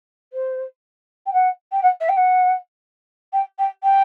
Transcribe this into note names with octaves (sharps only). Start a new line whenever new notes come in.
C5
G5
F#5
G5
F#5
E5
G5
F#5
G5
G5
G5